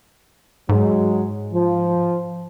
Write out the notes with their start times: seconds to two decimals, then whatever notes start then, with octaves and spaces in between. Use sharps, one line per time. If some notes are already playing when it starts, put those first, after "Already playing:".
0.69 G#2 F#3 G#3
1.53 F3